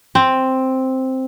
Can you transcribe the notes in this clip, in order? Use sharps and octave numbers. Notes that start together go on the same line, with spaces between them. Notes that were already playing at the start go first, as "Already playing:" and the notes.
C4